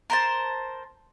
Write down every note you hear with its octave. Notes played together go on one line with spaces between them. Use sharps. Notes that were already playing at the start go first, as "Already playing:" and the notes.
A#4 C5 A5